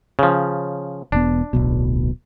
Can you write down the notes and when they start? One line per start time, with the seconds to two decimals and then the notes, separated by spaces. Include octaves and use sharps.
0.19 C#3 F3
1.12 E1 B3 D4
1.53 D1 B1 B2